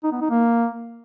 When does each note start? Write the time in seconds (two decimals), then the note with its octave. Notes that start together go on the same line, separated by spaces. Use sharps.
0.04 D#4
0.12 B3
0.21 D#4
0.30 A#3